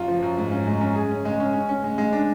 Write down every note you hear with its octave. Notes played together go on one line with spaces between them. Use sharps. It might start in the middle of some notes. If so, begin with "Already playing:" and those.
Already playing: F#2 F4
F3
F#2
G#2
C#4
G#3
C#4
G#4
C#4
G#3
C#4
C#4
C#4
G#3
G#3
D4